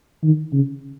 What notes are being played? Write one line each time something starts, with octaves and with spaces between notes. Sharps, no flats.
D#3
C#3